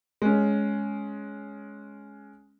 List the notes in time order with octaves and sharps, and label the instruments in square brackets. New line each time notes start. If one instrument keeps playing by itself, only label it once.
[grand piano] G#3 C#4